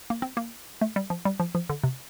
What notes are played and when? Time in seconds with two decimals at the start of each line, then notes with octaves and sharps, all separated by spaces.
0.10 A#3
0.22 C4
0.37 A#3
0.81 A3
0.96 G3
1.10 F3
1.25 G3
1.40 F3
1.55 F3
1.70 D3
1.84 C3